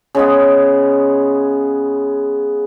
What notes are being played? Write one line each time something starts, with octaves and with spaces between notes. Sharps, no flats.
C#3 G#3 B3